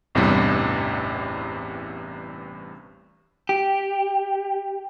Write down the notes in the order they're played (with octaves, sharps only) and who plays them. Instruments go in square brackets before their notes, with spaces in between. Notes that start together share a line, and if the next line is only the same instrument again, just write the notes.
[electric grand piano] A1 E2 G2 C3 G3 G4
[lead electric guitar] G4